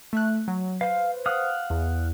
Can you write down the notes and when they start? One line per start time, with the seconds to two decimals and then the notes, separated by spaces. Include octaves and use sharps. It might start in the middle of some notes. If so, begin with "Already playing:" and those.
0.13 A3 E5 F#6
0.48 F#3
0.81 B4 C5 F5
1.26 F5 F#5 D#6
1.70 E2